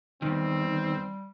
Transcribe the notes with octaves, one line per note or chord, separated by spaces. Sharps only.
E2 D#3 G3 C4